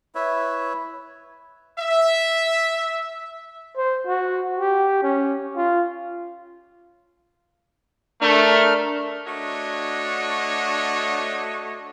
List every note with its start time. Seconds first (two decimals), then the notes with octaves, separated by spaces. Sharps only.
0.15 E4 B4 C#5 E5
1.79 E5
3.77 C5
4.07 F#4
4.59 G4
5.03 C#4
5.56 F4
8.21 A3 D4 A#4 F6
9.26 A3 D4 F#4 C#5 D#5